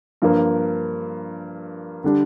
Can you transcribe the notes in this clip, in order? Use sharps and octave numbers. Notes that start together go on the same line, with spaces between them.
G2 F3 A#3
D3 G3 D4